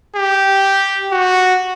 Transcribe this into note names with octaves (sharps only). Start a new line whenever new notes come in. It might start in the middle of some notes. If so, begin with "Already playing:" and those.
G4
F#4